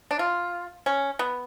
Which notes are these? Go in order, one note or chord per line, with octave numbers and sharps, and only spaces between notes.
D4
F4
C#4
B3